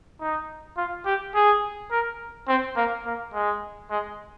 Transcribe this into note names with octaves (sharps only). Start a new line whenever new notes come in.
D#4
F4
G4
G#4
A#4
C4
A#3
A#3
G#3
G#3